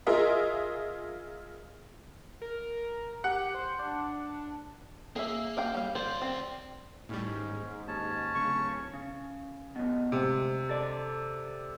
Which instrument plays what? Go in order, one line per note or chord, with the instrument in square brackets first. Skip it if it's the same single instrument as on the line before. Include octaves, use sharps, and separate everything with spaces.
[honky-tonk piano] F4 G#4 A#4 D#5 E5
[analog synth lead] A#4
[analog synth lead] G4 [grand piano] F#5
[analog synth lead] C5
D4
[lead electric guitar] A#3 [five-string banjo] G#4 E5
[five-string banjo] D5 F5 G5
G3 F5
[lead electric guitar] D2 D5 [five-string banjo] C5
[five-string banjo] C4
[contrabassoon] D#2 [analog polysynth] A2 G3 [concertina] C#4
[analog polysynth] G#2
[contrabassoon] D#2 [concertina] C#4 C#5 A5
[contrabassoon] D1 [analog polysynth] C#3 [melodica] C#6
[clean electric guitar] C#3
F#2 B2
[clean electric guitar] D2 G#2 [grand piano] C3
[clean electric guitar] A4 D5